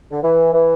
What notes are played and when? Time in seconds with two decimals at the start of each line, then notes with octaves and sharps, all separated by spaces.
0.11 D3
0.23 E3
0.53 E3